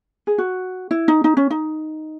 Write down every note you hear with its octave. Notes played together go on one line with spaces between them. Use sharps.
G#4
F#4
E4
D#4
D#4
C#4
D#4